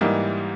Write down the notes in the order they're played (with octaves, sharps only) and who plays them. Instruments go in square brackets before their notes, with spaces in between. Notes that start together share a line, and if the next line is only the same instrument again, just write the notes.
[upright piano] G#2 E3 G3 A#3 D#4